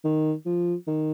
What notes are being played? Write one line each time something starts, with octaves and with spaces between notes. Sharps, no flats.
D#3
F3
D#3